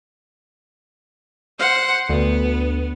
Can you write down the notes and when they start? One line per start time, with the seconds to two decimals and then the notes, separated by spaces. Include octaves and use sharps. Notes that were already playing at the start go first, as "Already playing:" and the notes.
1.59 C5 F#5
2.09 D2 B3